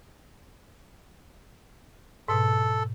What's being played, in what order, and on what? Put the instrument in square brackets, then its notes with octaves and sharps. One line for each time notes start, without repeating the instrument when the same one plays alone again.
[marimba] G#2 B2 [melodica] A4